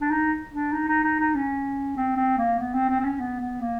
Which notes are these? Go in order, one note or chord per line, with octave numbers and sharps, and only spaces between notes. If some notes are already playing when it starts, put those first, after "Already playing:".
D4
D#4
D4
D#4
D#4
D#4
D#4
C#4
C4
C4
A#3
B3
C4
C4
C4
C#4
B3
B3
A#3